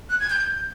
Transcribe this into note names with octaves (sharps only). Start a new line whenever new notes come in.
F#6
G#6
G6